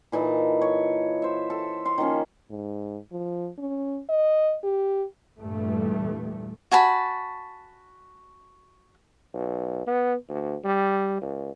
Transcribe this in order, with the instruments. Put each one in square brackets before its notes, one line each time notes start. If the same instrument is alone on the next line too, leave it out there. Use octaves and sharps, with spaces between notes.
[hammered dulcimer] A#2 E3 D#4 A4
C#5
C5 E5
A4
F5 C6
D#3 F3 A#3 C#4
[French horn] G#2
F3
C#4
D#5
G4
[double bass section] E2 G2 A#2 E3 G3 A3
[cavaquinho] F#4 G#5 A5 B5
[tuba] B1
B3
D2
G3
C#2